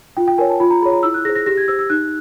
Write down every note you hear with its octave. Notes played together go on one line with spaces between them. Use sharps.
F4 G5
G5
A#4 C#5 G#5
A5
F4 B5
A#5
G#4 C#5 B5
A#5
E4 E6
F#6
G#4 C5 A#6
A#6
G4 A#6
G#6
C5 E6
E6
D#4 F#6